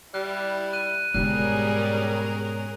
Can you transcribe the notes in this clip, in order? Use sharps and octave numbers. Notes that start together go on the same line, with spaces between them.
G3 E4 F#6
F#6 D#7
G#2 B2 G3 C#4 G#4 A#4 F#6